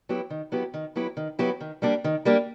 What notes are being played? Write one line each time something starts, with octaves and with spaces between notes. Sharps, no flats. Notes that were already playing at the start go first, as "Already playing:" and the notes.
F#3 B3 E4 G4
D#3
F#3 B3 E4 G4
D#3
F#3 B3 E4 G4
D#3
F#3 B3 E4 G4
D#3
G3 A#3 D4 G4
D#3
G3 A#3 D4 G4